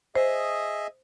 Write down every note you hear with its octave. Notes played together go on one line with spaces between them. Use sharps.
G#4 C5 D#5 E5